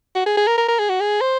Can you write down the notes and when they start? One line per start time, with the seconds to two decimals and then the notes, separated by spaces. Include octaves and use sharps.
0.15 F#4
0.26 G#4
0.37 G#4
0.47 A#4
0.58 A#4
0.68 A#4
0.79 G#4
0.90 F#4
1.00 G#4
1.21 C5